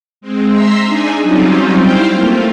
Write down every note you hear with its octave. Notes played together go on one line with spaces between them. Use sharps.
G#3 C4
E5 A#5 C6 E6
D4 D#4 G#4 G#5
F#3 G3 C4 C#4 D#4 F4
C4 E4 C5 F5 G5
A3 A#3 F4